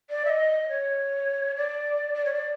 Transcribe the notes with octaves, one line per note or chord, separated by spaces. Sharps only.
D5
E5
D#5
C#5
D5
D5
C#5
D5